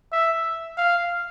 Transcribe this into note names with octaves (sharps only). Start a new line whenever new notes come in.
E5
F5